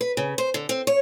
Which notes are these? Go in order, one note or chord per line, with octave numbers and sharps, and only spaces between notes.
B4
C#3
C5
D3
C4
C#5